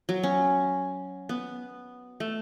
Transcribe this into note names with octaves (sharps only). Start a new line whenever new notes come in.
F#3
C#4
B3
A3